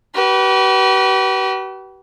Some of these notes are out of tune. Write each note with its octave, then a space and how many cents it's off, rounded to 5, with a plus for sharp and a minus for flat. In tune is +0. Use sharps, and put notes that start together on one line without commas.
G4 -45 B4 -20